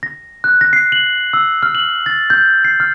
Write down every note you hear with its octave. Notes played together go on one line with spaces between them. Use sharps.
A#6
F#6
A#6
C7
F#7
E6
F6
F#7
A6
G6
C7
F6